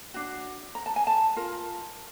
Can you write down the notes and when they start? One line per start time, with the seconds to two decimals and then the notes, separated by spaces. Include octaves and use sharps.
0.14 D4 F#4
0.75 A#5
0.86 A5
0.96 G#5
1.07 A5
1.36 F4 A#4